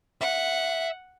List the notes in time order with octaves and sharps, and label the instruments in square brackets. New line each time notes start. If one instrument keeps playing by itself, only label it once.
[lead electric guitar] E5 [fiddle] F#5